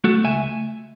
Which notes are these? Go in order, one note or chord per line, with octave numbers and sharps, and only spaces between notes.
A3 F#4 A4
C#2 E5 G#5